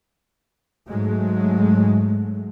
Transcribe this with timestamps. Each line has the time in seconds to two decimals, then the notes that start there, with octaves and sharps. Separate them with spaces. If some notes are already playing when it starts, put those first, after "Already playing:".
0.89 G#2 F#3 G#3 A3